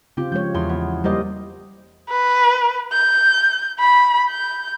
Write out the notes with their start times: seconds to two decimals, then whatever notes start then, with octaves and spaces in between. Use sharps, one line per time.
0.17 C#3 C4 F4 G4
0.32 F3 G#3 C#5 G6
0.54 E2 C6
0.69 B3
1.04 G3 A#3 F4 G4 C5 D#5
2.09 B4
2.92 G6
3.79 B5
4.30 G6